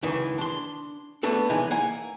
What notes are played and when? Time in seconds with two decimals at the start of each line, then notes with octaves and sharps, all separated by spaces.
0.03 C#2 F#2 D#3 E3
0.38 D4 C6
1.23 A3 B3 D4 A4
1.50 B1 E3 G#3 D#4 E4 G#5
1.71 A#3 F#5 G#5